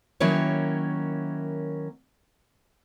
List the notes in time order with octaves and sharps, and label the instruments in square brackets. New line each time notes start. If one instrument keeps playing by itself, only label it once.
[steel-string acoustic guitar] D#3 F#3 A#3 C#4 E4 C#5